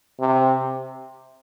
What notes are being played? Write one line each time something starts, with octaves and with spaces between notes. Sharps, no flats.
C3